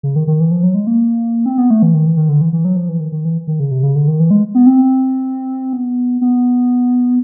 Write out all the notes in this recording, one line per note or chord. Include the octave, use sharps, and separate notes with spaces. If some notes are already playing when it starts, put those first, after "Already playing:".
C#3
D#3
D#3
E3
F3
F#3
G#3
A#3
C4
B3
A3
E3
D#3
E3
D#3
D3
E3
E3
F#3
F3
E3
D#3
D#3
E3
D#3
C#3
C3
C#3
D3
D#3
E3
G#3
B3
C4
B3
B3